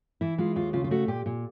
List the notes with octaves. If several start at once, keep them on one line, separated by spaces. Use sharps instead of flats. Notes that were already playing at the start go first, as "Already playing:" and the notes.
E3 E4
G#3 F4
D#2 F4
C#3 F4
F4
A3 F#4
A#2 G4
A#2